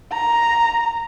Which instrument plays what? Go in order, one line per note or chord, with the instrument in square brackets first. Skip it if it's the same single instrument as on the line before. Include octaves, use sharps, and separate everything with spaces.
[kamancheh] A#5